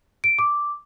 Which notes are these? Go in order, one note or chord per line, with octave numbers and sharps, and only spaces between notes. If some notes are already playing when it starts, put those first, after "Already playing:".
D7
D6